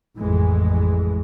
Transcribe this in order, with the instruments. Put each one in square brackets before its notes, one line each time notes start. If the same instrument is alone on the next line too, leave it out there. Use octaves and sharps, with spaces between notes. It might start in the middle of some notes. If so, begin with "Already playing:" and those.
[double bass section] A1 F2 E3 G#3